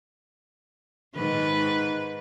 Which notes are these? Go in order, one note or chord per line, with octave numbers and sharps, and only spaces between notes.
G#2 D#3 B4